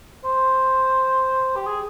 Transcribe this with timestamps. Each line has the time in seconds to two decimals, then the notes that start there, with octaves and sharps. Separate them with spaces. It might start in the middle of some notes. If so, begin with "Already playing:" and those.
0.25 C5
1.56 G4
1.67 G#4